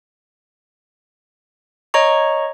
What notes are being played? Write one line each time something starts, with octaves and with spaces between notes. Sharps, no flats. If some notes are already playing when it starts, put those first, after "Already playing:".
C#5 D#5 A#5 C#6